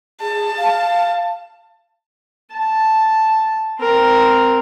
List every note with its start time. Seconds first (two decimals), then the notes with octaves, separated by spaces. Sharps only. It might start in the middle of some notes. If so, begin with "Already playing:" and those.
0.21 G#4 A5
0.57 F5
2.52 A5
3.80 C4 A#4